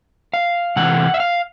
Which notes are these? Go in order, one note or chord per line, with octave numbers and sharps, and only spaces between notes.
F5
C3 E3 A3 C4 F#5
E5
F5